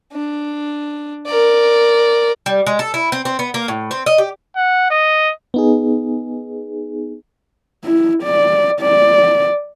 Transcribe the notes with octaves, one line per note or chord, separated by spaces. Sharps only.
D4
A#4 D5
G3
G#3
A4
E4
C4
C4
B3
A#3
A2
C4
D#5
G4
F#5
D#5
B3 D#4 G#4
E4
D5
D5